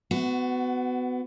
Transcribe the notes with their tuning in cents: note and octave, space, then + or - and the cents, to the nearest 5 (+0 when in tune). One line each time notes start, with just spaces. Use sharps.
B3 +25 F#4 +0